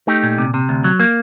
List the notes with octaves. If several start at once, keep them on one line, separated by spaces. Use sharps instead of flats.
A3 D#4 G4
A#2
C3
C3
D2
F#3
A#3